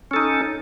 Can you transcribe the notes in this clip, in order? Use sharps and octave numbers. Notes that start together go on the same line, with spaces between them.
C#4 D#4 A4